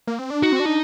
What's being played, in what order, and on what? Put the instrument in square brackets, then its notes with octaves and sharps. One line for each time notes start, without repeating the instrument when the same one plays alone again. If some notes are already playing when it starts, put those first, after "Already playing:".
[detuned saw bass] A#3
C4
D4
[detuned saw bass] D#4 [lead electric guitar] F#4
[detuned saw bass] C4
D4
[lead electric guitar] D#4